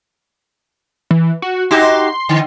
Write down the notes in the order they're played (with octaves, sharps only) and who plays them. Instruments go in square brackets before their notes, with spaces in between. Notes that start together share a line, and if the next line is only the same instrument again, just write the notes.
[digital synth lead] E3
F#4
[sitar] D#4 F#4 G4 [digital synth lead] C6
[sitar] D3